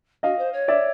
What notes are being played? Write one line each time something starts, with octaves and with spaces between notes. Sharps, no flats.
F#4 D#5 F5
C5
C#5
D5 E5